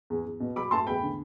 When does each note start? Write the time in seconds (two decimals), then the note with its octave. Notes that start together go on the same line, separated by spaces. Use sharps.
0.10 E2
0.26 E2
0.40 B2
0.56 F#3 B5 D6
0.71 A3 A5 C6
0.87 E2 G5 B5
1.03 D3